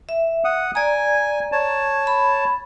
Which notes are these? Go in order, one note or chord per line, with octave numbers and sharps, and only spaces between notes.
E5
F#5 D#6
D5 G#5 A#5
C#5 A5
B5